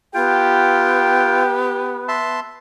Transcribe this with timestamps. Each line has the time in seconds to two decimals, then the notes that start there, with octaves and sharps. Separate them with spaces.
0.14 B3 F4 G4 G5
2.08 E5 A5 C6